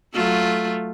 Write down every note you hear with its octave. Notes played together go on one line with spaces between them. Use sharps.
F#3 A3 F4